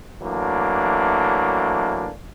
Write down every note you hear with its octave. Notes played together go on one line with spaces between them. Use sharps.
E3 F#3 A3 A#3 D4